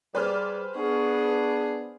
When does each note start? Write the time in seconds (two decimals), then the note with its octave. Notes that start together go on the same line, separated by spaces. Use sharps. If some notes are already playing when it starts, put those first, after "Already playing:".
0.15 G3 G#4 B4 C5 D5 F6
0.76 B3 D4 G#4 C#6